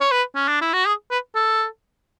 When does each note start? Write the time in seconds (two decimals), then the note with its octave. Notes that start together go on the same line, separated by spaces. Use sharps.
0.01 C#5
0.11 B4
0.35 C#4
0.48 D4
0.61 E4
0.73 F#4
0.86 G#4
1.11 B4
1.35 A4